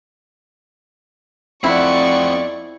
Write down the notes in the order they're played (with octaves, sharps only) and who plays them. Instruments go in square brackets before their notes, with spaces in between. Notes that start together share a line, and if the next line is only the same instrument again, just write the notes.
[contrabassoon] F2 [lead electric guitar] C4 F#5 [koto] E4 [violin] D5 C#6